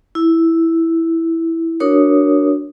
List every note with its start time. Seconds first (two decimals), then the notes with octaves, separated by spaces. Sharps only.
0.15 E4
1.80 D4 F#4 A#4 C#5 D#6